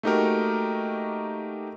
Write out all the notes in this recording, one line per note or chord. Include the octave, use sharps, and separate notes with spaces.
A3 A#3 D#4 F#4 G4 A#4